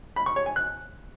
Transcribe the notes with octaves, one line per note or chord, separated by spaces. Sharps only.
B5
C#6
C#5
G#5
F#6